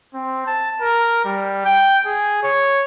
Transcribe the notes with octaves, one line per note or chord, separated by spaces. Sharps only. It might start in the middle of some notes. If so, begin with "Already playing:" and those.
C4
A5
A#4
G3
G5
G#4
C#5